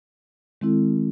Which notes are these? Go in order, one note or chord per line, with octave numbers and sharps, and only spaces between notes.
D#3 G#3 C4 E4 A4